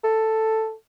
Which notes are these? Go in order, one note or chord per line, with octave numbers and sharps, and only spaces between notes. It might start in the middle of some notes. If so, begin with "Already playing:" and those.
A4